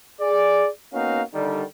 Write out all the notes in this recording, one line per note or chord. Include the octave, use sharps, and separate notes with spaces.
G#4 D5
A#3 B3 C#4 D#4 F#4 F5
D3 D#3 G3